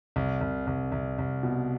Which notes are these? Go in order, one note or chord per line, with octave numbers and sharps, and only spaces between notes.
C2
C2
C2
C2
C2
B2